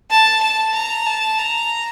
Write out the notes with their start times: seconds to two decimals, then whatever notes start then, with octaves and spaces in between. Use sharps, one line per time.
0.10 A5
0.42 A5
0.74 A#5
1.07 A5
1.39 A#5